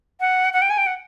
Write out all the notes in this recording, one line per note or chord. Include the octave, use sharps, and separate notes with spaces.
F#5
F#5
G5
G#5
G5
F#5